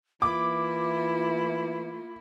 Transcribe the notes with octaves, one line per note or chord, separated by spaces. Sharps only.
E3 A#3 E4 F4 D6